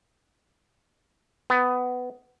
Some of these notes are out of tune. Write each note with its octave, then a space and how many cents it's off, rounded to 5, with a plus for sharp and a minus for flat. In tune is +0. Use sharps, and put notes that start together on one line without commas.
B3 +15